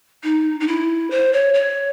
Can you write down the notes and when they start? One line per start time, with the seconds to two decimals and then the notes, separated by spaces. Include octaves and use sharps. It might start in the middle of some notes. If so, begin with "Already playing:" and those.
0.24 D#4
0.60 D#4
0.67 E4
1.11 C5
1.33 C#5
1.54 C#5